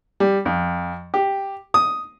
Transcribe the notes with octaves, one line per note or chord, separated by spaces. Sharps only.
G3
F2
G4
D#6